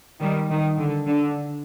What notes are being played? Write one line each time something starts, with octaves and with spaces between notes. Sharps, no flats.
D#3 G3
D#3
D3
D3